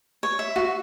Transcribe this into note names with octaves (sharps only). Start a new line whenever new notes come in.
C#5
E5
F#4